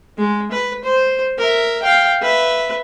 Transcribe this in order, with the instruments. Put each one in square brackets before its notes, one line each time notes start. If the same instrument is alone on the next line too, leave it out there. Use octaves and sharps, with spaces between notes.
[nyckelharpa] G#3
B4
C5
A#4 E5
F5 G5
B4 E5